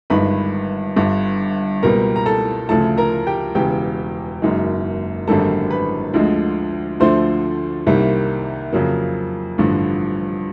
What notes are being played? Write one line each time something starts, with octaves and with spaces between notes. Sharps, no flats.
G1 G2 D#3 G#3 B4 B5
G1 G2 D3
C#2 B2 G3 A#3 A#4 A#5
A#5
A4 A5
D2 C#3 F3 A3 A4 A5
A#4 A#5
G4 G5
E1 E2 C#3 G4 G5
F#1 F#2 D#3 G#3
G#1 F#2 D3 G3 A#3 A4 A5
B4 B5
D2 D3 F3 G#3
D2 D3 F3 A3 C5 C6
C2 C3 D#3 G3 A#3
F2 C#3 F#3 A#3
A1 G2 D3 F3